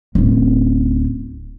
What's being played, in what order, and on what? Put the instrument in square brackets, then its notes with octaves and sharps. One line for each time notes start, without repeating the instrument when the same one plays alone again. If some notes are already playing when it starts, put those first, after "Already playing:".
[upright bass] D1 C#4